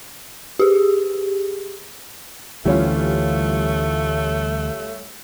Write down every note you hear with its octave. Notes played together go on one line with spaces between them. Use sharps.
G4 G#4
D2 E3 G3 A3 C#4 F4